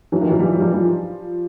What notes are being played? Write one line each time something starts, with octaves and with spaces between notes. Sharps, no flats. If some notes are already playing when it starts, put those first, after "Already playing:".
E3 F#3
D#3 F3
E3 F#3
F3 G3
F#3
F3 G3
F3 G3